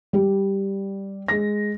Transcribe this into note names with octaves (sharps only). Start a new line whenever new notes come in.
G3 G4
G#3 A#6